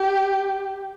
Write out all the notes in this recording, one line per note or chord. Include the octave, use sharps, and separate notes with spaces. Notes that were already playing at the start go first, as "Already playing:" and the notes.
Already playing: G4